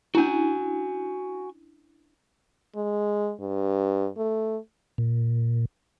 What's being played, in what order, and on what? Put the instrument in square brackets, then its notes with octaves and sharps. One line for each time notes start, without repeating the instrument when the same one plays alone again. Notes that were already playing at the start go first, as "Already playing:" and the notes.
[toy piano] C#4 D4 E4 [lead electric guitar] F#4 G#5
[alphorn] G#3
G2
A3
[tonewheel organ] A#2